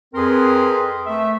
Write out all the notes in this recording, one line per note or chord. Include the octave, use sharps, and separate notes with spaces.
F2 C4 G#4 A#4 B4 C6
A3 E5